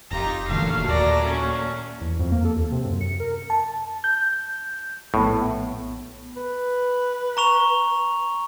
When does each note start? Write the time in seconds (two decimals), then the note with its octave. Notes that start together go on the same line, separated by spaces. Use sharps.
0.11 F1 D#4 F4 G4 A#5
0.49 F1 A#2 D3 E3 F#3 A3 F5
0.89 D#2 D5 A#5
1.25 C#4
2.01 E2
2.19 F2
2.32 A#3
2.45 A4
2.56 D#2
2.72 C3
2.84 F#2
3.01 C#7
3.20 A#4
3.50 A5
4.04 G6
5.14 A#1 A2 B3
6.37 B4
7.37 A#5 C#6 F7